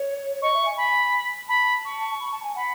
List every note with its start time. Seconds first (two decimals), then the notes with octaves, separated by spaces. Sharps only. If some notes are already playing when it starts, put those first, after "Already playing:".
Already playing: C#5
0.42 D#5 C#6
0.54 E5
0.65 G#5
0.77 G#5 B5
1.48 A5 B5
1.85 C#6
2.20 B5
2.32 A5
2.43 G#5
2.55 F#5 B5